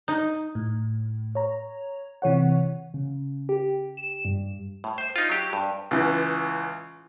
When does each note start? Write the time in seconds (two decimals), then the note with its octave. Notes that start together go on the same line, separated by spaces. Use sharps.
0.08 D#4
0.55 A2
1.35 C#5 A#5
2.22 C3 E3 C#5 F#5
2.94 C#3
3.49 G4
3.97 E7
4.25 G2
4.84 A2
4.98 C5
5.16 D#4 F4
5.29 F#3 G4
5.53 G2
5.91 C#2 E3